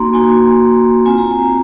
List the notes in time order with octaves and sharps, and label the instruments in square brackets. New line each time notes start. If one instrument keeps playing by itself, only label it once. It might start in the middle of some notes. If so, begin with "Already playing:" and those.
Already playing: [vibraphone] A#3 D#4 F#4 A#5 C6
A#3 D#4 F#4 G#5
C4 F4 G#5
A#5
G#5